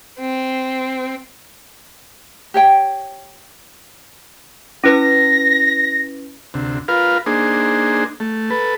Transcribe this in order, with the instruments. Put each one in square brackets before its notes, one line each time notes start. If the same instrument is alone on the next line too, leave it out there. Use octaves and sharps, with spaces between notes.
[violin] C4
[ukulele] G4 C#5 G5
[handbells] C#4 E4 B4 [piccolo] A#6
[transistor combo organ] D2 C3
F4 A#4 B4 F5
A#3 D4 D#4 G#4 C5
A3
A4 B4